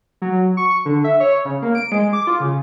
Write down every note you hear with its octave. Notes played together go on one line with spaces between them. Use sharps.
F#3
C#6
D3
E5
C#5
C#3
A#3
D7
G#3
D6
F4
C#3